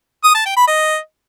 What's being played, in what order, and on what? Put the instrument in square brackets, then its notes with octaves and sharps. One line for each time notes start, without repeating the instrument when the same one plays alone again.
[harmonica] D#6
A5
G5
B5
D#5